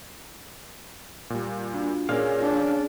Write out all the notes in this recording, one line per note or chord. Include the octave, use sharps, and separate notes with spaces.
A#2 G3
D4 F4 F#4
A#2 C#4 G#4 A#4 D5 F5
D4